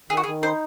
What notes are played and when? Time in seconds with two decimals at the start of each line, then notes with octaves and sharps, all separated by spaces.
0.10 D#3 G#4
0.17 F#4
0.24 G#4
0.26 D#3
0.42 D#4 C5